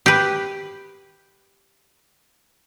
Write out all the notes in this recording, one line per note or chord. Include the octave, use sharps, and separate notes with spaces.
G4 B4